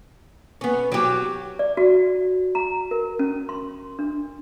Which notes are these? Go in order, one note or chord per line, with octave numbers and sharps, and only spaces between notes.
B3 C#4
F#3 G4
D5
F#4
A#5
A#4
C#4
C6
D4